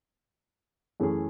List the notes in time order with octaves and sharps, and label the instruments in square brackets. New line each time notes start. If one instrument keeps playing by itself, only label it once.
[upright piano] F#2 E3 A3 C#4 G#4